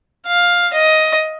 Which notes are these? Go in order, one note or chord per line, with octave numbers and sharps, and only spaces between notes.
F5
D#5